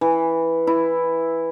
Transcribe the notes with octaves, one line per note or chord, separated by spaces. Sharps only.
E3
E4